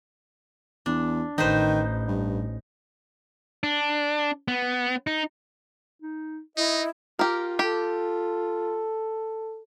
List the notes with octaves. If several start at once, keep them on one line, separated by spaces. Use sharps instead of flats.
E2 D4
A1 D#3 D#4 B4 C5
G2
D4
B3
D#4
D#4
D#4 E4 D#5
F4 G4 A#4
G4 A4